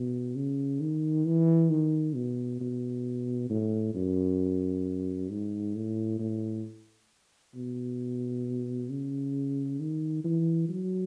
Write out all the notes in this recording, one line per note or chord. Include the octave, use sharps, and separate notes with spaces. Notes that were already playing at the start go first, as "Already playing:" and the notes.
Already playing: B2
C#3
D#3
E3
D#3
B2
B2
A2
F#2
G#2
A2
A2
B2
C#3
D#3
E3
F#3